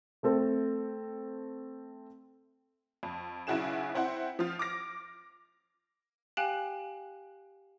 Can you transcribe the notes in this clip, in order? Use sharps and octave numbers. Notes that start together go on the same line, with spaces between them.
A3 C4 A4
F2
B1 C#3 E4 F#4 G#4 E7
C4 E4 C5 F#5
F3 F4
D6 F6 A#6
G4 F5 G5 G#5 F#6 F#7